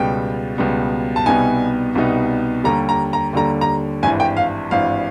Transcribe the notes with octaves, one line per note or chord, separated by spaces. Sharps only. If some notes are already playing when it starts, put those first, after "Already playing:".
Already playing: C#2 B2 G3 B3 G5
C#2 B2 G3 B3
A5
C2 B2 G3 B3 D#4 G#5
C2 B2 G3 B3 D#4
D#2 D3 G3 A#5
A#5
A#5
D#2 D3 G3 A#5
A#5
G#1 G2 E3 G#5
G5
F5
G#1 G2 E3 F5